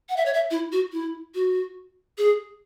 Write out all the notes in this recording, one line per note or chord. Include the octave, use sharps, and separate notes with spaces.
F#5
E5
C#5
E5
E4
F#4
E4
F#4
G#4